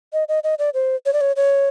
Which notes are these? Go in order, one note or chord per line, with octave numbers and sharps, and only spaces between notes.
D#5
D#5
D#5
D5
C5
C#5
D5
C#5
C#5